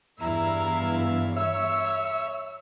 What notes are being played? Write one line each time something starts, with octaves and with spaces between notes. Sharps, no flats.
E2 G2 E4 E5 F5 A#5
C#5 E5 E6